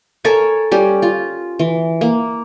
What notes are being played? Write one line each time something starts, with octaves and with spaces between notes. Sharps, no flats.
A4 A#4 C#5 G#5
G3 C#4 G4
F4
E3
A#3